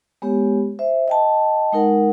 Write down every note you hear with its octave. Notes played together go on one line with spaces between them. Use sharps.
G#3 B3 G4 C#5
C5 E5
D#5 G5 A5
G#3 D#4 A#4 F#5